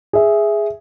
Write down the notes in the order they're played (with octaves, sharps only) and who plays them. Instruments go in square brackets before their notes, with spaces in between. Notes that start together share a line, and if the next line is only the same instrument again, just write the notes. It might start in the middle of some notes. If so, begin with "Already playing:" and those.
[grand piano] G#4 E5